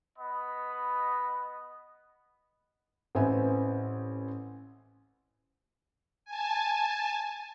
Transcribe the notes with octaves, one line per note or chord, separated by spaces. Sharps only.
B3 D#5 B5
A1 C4 B4 E5 G#5
G#5 A5